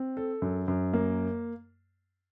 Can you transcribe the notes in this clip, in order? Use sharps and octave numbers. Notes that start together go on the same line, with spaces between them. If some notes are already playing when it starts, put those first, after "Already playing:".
Already playing: C4
A4
F#2
F#2
A#3